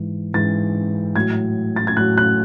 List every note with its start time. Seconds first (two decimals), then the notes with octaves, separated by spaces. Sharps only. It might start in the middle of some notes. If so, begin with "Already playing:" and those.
Already playing: G#2 E3
0.34 G#2 E3 A6
1.16 A2 F#3 G#6
1.76 A6
1.87 G#6
1.97 A2 F#3 F#6
2.18 F#6